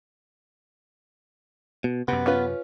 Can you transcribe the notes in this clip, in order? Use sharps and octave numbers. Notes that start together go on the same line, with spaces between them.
B2
F#2 C3 B3
C#4 F4 B4